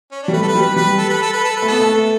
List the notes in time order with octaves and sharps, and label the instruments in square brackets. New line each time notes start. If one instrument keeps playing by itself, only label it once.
[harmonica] C#4
D4
[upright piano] G3
[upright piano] A3 [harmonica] B4
[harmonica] A4
B4
[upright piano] G3
[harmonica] B4
[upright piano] G3 [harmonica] B4
[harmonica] A4
B4
A4
B4
A4
B4
[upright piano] A3
[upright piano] B3 [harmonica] A4
[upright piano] A3